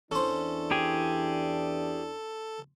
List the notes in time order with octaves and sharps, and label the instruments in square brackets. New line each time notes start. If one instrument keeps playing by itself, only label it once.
[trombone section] E2 E3 D4 [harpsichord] C#4 C5 [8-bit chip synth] A4
[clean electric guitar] G4 G#4